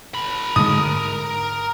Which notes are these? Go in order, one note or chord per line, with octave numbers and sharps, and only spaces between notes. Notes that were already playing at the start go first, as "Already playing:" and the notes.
A#4 B5
G#2 D3 G#3 D#6